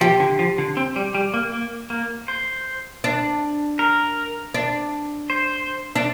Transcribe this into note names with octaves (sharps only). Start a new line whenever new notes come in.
F3 G4
D3
F3
D3
C4
G3
G3
A#3
A#3
A#3
C5
D4
A#4
D4
C5
D4